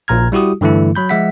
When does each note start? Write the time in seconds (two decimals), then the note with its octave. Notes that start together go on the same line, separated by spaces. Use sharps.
0.08 A#1 A#2 A#5 F6 G#6
0.32 G3 E4 F#4 G4 D#6
0.61 G2 D3 E3 A3 E4
0.95 F#3 B5 G6
1.09 F3 G#3 E5 F#5 B6